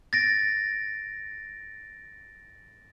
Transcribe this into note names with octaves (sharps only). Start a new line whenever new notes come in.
A6 A#6 D7